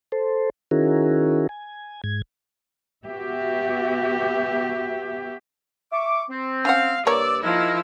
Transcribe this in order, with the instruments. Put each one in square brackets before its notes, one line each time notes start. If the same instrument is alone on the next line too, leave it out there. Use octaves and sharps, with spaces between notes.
[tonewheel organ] A4 C5
D#3 C#4 E4 F#4 G#4 A#4
G#5
G#2 G#6
[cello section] B3 F#4 G4 E5
[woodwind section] E5 C#6 D6
C4
[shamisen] C#4 F#5 [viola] F5
[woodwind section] G2 D6 E6 [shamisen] A#3 C#5 [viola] D5
[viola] F3 E4 [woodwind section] D#4 G#4 A#4